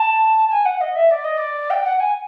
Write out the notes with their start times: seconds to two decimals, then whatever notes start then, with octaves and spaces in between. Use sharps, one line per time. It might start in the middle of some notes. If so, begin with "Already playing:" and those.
Already playing: A5
0.50 G#5
0.65 F#5
0.80 D#5
0.95 E5
1.10 D5
1.24 D#5
1.37 D5
1.70 G5
1.84 F#5
1.99 G#5